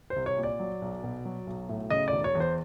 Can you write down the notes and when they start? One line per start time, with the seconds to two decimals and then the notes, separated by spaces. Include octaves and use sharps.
0.10 C5
0.16 C2
0.26 C#5
0.37 A#2
0.43 D5
0.59 F#3
0.82 B1
1.04 B2
1.25 F#3
1.47 B1
1.69 A2
1.90 C#3 D#5
2.08 D5
2.13 E1
2.24 C#5
2.35 E2
2.40 C5